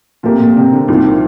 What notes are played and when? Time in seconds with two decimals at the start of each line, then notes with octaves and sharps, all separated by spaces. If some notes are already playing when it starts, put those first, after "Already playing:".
0.23 A#2 F3 A3 C4 G4 A#4
0.40 A#2
0.56 C3
0.72 D3
0.88 C2 A#2 D#3 F3